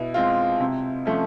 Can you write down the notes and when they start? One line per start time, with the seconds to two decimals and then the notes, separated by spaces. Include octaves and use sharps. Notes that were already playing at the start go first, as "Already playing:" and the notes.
Already playing: B2 E4
0.14 G#3 C4 F4
0.60 C3
1.06 F3 A3 C#4